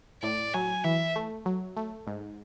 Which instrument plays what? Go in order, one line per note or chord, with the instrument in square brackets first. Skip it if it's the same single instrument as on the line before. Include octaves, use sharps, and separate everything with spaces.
[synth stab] A2 [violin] D5
[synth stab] F#3 [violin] G#5
[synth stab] E3 [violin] E5
[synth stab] A3
F#3
A3
G#2